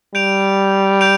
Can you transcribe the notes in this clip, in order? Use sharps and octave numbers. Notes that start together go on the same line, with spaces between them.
G3 G6 D7 F7
G6 D7 F7